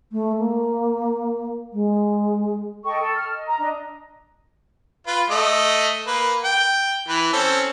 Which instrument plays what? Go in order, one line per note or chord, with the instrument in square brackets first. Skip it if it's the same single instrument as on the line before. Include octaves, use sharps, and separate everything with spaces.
[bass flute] A3
A#3
G#3
[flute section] A4 D#5 G5 C#6
A4
F6
D#5
A#5
D4 D#5
[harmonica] F4 B4
A3 D#5
A#3 B4
G5
E3 B4
C4 C#4 A4